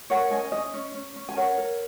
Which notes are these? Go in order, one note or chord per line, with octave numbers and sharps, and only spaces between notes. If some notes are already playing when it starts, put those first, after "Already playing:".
A#4 C#5 F#5
C#4 D#5 G#5
C#4 D#5
C#4
C#4
C#4
G#5
A#4 C#5 F#5
A#4